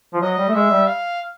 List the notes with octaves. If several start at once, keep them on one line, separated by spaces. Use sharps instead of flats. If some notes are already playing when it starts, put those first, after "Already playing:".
F3
F#3 D#5
G3
A3
G#3 E5
G3
F5